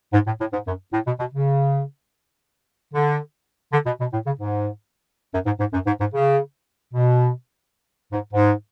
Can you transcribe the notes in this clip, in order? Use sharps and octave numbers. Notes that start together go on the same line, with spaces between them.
G#2
A2
A2
G#2
F#2
A2
B2
B2
C#3
D3
D3
B2
B2
A2
C#3
G#2
F#2
G#2
G#2
F#2
G#2
G#2
C#3
B2
G#2
G#2